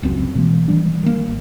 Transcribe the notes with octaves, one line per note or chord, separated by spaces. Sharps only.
E1 C#2 F#2 C4
B2 E3 G#3 A#3
D#3 E3 G3 D4
D#3 A#3
G#1